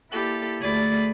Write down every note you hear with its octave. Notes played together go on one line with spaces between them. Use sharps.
A#3 E4 G4 A4 D5
D2 A3 G#4 D5 B5 A6